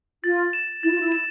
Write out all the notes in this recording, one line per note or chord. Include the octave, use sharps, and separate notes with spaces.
F4 A6
E7
E4 A6
F4
E4
E7